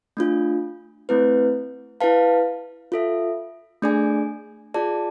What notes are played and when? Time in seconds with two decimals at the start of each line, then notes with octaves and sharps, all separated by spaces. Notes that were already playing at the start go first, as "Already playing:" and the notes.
0.17 A3 D4 F4
1.09 A3 C4 E4 B4
2.01 E4 B4 F5 A5
2.92 F4 A4 E5
3.83 A3 D4 G#4 D5 G#5
4.74 F4 G#4 D5 A5